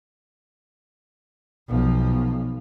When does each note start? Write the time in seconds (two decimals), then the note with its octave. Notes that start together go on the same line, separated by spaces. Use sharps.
1.68 B1 F3